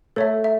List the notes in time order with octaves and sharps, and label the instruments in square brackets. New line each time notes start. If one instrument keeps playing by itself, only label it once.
[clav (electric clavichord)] A3 [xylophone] A4 C#5 E5
[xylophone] E5